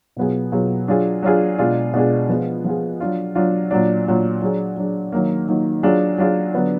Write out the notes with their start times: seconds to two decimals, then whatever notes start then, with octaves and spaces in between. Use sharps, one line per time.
0.16 B2 F#3 B3 F4 G#4
0.52 B2 F#3 B3 F4 G#4
0.88 F#3 D4 F4 G#4
1.23 F#3 D4 F4 G#4
1.58 B2 G#3 D4 F4 G#4
1.94 B2 G#3 D4 F4 G#4
2.29 F3 B3 F4 G#4
2.64 F3 B3 F4 G#4
3.00 F#3 D4 F4
3.35 F#3 D4 F4
3.71 A#2 F#3 D4
4.06 A#2 F#3 D4
4.42 F#3 D4 G#4
4.77 F#3 D4 G#4
5.12 D#3 F#3 A#3
5.48 D#3 F#3 A#3
5.83 F#3 D4 F4 G#4
6.18 F#3 D4 F4 G#4
6.54 D3 F#3 B3 D4